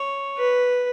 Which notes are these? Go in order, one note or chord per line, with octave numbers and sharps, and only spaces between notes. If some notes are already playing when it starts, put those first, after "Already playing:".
Already playing: C#5
B4